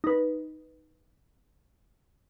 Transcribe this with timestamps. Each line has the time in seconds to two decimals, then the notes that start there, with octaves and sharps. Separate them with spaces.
0.04 D#4 B4